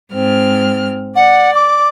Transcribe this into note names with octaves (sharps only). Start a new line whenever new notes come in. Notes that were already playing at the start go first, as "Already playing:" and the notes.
G#2 C4 F6
D5 F#5
D6